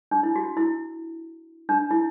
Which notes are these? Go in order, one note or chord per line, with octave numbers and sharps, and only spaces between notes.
D4
E4
F#4
E4
D4
E4